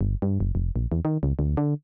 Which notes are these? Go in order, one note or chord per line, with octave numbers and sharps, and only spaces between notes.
G1
G2
F#1
F1
A#1
E2
D#3
C#2
D2
D3